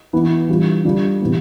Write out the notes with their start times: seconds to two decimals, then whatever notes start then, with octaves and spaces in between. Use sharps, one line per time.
0.13 E3 B3 E4
0.49 E3 G3 D4 F4
0.84 D3 G3 D4 F4
1.21 C3 E3 B3